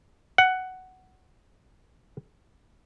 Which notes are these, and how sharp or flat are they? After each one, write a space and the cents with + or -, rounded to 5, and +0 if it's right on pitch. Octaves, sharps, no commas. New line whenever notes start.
F#5 +10